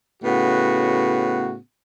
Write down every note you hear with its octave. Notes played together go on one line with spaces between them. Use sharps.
A2 C#3 B3 F#4